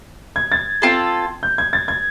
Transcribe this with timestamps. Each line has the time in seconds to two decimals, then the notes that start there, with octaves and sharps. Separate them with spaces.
0.36 G#6
0.52 A6
0.82 C4 F4 A4
1.43 G6
1.58 G#6
1.73 A6
1.88 G#6